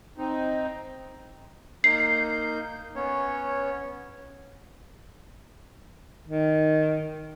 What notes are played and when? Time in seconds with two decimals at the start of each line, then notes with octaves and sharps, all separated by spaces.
0.18 C4 D#4
1.84 A#3 D#4 G6 C7
2.96 B3 C#4 C#5
6.27 D#3